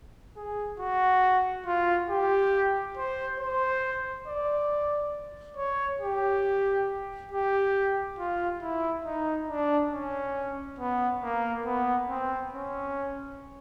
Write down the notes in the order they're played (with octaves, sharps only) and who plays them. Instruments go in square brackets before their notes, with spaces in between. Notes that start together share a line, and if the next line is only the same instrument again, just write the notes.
[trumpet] G#4
F#4
F4
G4
C5
C5
D5
C#5
G4
G4
F4
E4
D#4
D4
C#4
B3
A#3
B3
C4
C#4